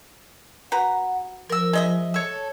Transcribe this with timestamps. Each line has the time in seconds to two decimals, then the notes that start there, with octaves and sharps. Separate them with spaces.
0.72 F#4 B4 F#5 A#5
1.50 F3 A#4 E6
1.73 G#3 D#5 E5
2.14 A4 C#5